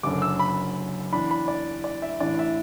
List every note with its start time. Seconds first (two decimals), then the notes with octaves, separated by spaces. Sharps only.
0.03 F#1 F#2 D3 D6
0.22 E6
0.39 B5
1.13 E2 E3 D4 B5
1.31 B5
1.48 D5
1.84 D5
2.02 E5
2.20 A1 A2 E3 D4 D5
2.39 E5